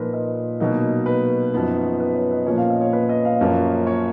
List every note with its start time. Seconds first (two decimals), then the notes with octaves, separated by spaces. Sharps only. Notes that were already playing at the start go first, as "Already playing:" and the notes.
Already playing: A#2 F3 A#3 D#4 A#4 B4
0.13 D#5
0.60 B2 F#3 A#3 D#4
1.06 B4
1.53 F#2 F3 B3 D#4
2.00 B4
2.15 C#5
2.31 D#5
2.47 A#2 F3 A#3 C#4 C#5
2.58 F5
2.70 D#5
2.81 C#5
2.93 B4
3.09 D#5
3.25 F5
3.41 F#2 F3 A#3 C#4
3.87 C#5